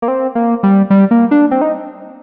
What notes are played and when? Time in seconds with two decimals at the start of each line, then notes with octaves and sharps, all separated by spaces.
0.02 A#3
0.08 C4
0.35 A#3
0.63 G3
0.90 G3
1.11 A#3
1.31 D4
1.51 C4
1.61 D#4